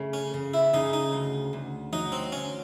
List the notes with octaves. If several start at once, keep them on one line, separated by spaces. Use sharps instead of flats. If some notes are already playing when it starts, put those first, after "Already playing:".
Already playing: C#3 A3
C#4
C#3
E4
C#3 D#4
D#4
D2
D2
F#3 D#4
C4
D2 C#4